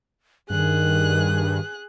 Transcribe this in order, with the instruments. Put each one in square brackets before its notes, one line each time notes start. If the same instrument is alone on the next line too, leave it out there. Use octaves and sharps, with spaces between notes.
[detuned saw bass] G2 [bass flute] D#3 [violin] G#4 F#6